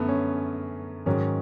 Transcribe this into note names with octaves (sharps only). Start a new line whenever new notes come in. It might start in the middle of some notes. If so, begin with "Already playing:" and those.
Already playing: F#2 D3 A3 B3
C#4
G#2 D#3 F#3 C#4